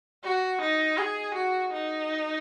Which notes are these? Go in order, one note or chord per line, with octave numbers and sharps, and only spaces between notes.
F#4
D#4
G#4
F#4
D#4